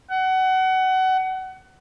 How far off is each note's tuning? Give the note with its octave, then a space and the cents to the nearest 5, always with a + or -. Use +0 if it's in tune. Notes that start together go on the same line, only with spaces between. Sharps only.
F#5 +25